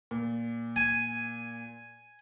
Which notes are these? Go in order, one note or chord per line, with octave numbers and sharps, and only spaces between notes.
A#2
G#5